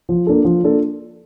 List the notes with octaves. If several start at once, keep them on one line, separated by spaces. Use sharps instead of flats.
F3
A#3 D4 F4 A4
F3
A#3 D4 F4 A4